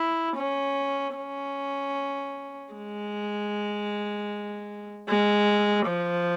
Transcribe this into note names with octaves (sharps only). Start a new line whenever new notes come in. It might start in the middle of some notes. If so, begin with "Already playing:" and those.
Already playing: E4
C#4
C#4
G#3
G#3
F3